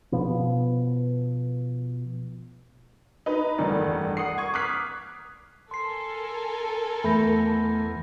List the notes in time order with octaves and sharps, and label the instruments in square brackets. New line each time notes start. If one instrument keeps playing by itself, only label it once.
[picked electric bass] B2 F3 B3
[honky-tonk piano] D#4 B4
F1 E2 G2 D#3 D5
F#5 D#6 C7
C#6 D#6 G#6
D6 D#6 F6 F#6 B6 C7
[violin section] A4 A#4 G#5 [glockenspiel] C6 C7
[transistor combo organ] E2 [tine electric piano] A3 [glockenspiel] B5 G6 A#6